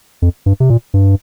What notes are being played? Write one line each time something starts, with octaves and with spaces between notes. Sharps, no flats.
F2
G2
C3
A#2
G2